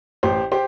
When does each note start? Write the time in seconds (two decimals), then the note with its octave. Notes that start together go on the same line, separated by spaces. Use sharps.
0.23 A1 G4 C5
0.52 G4 C5